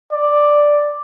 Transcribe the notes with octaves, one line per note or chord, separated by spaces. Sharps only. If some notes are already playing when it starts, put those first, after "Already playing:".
D5